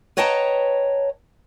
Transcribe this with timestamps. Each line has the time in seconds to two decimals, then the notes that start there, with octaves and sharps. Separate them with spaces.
0.17 B4 C#5 D#5 G5 A5 A#5